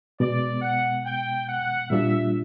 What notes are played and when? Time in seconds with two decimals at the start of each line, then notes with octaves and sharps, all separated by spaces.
0.20 B2 G#3 B3 D5
0.62 F#5
1.06 G5
1.48 F#5
1.90 A#2 G3 A#3 D4 F4 E5